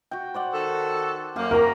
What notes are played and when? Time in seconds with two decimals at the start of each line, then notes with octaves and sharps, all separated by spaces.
0.11 F#4 G5
0.34 C5 D5 F#5
0.54 D#3 F#4 A4
1.36 F#2 A#3 G4 F5
1.51 F#4 A#4 A#5